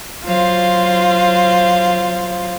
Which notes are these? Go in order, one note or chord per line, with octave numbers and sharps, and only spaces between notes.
F#3 F4 C5 F5